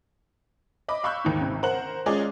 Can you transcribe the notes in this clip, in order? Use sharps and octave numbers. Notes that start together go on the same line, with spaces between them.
D#5 B5 D6
F5 B5 C#6 E6 F#6 G6
D#2 G#2
G#1 C3
A#4 C5 F#5 F#6 F#7
G#3 C#4 F4 G#4 D5